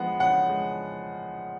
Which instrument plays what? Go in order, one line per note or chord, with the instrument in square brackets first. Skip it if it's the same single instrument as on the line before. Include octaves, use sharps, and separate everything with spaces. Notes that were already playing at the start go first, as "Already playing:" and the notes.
Already playing: [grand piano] F3 G#3 B3 [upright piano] F#5
[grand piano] C#3 [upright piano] F#5
[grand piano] G#3